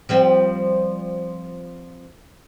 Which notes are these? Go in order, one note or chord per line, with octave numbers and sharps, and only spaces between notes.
F3 G3 C4